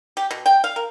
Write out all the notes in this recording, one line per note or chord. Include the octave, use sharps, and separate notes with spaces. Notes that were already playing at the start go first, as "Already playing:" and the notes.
G4
B2
G5
F5
A#4